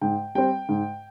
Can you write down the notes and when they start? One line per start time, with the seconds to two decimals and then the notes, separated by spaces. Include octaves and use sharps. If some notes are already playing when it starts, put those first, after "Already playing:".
0.01 G#2 G5
0.35 G3 C4 G5
0.69 G#2